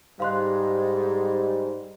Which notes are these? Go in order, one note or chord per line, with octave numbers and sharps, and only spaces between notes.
G#2 G3 F5 C6 F#6